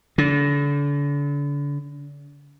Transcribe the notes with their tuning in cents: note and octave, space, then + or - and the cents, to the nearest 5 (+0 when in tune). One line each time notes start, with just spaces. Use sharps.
D3 -35